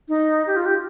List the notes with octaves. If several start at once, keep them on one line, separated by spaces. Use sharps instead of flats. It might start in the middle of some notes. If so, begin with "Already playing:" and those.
D#4
G4
F4
G4